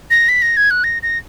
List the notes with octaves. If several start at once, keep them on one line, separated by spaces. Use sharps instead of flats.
A#6
B6
A#6
G#6
F#6
A#6
A#6